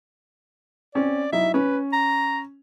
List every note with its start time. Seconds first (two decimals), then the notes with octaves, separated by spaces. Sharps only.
0.95 C4 C#4 D5
1.32 F#3 D#4 E4 E5
1.54 C#4 B4
1.93 A#5